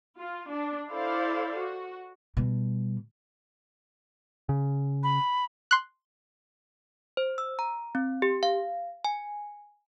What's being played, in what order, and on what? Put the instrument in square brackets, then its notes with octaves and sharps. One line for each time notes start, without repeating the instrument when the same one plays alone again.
[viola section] F4
D4
E4 A4 C5 D5 F5
F#4
[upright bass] B2 G3
[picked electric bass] C#3
[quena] B5
[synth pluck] C6 F#6
[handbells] C5
E6
A#5
C4
G4
F5
G#5